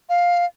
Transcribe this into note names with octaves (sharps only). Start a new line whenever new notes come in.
F5